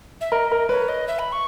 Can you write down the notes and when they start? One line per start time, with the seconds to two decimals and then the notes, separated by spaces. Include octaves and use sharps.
0.21 E5
0.32 A#4 D#5
0.52 A#4
0.69 B4 C#5
0.88 D#5
1.08 E5
1.19 B5
1.32 C#6